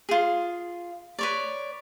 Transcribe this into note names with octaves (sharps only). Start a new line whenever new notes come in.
F4 G#4
B4 C#5 D5